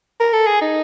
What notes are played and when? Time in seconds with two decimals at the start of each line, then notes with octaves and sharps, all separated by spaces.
0.20 A#4
0.33 A4
0.47 G#4
0.61 D#4